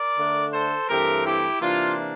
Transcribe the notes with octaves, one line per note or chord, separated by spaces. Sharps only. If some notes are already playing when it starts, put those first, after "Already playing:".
Already playing: A#4 D5
D3 A3 D4
A4 C5
G2 E3 A3 C4 G4 A#4
E4 G4
C3 E3 A#3 D4 F4